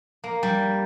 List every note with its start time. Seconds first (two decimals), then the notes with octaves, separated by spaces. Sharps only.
0.24 A#3
0.43 G3